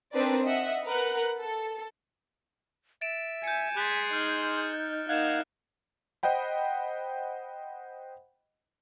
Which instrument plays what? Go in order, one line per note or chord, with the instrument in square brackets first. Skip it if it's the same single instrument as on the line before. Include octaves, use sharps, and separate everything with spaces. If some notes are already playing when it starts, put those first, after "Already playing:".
[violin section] C4 D4 D#4 A#4 B4 D5
D#5 E5 F#5
A#4 B4 F#5 F#6
A4
[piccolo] E5 [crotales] A6 D7 E7
[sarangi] G#5 [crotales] G6 C#7
[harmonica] G#4 C6 [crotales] F#6 A6 [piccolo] B6
[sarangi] D#4 [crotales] F6 [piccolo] G6
[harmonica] A#3 F5 F#5 [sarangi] D#4 [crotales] F#6 E7 [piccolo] G#6
[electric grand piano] C5 D#5 F#5 G5 B5